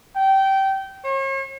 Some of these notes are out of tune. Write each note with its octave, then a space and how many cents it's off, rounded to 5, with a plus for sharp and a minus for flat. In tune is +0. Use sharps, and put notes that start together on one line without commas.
G5 -20
C#5 -40